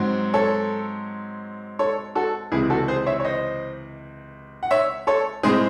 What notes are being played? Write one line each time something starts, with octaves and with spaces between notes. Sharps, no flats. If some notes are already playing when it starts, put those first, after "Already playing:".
Already playing: G#2 F#3 C4
A4 C#5
A4 C#5
F#4 A4
C#2 C3 E3 E4 G#4
F#4 A4
G#4 C5
C#5 E5
C#5
C5 D#5
F#5
C#5 E5
A4 C#5
A2 G#3 C4 G#4 C5